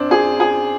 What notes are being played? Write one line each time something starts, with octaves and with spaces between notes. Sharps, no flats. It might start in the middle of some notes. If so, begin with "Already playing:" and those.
Already playing: F#2 C4 D4
G#4
G#4